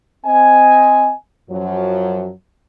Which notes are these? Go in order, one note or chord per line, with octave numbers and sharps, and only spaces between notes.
C4 D#5 G#5
F#2 F3 F#3